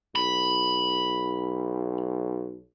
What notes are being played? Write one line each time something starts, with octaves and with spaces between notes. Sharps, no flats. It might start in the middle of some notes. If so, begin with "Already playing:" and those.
B1 B5